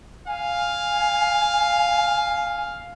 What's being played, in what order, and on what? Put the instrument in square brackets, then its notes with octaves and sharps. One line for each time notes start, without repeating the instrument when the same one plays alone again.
[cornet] F5 [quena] G#5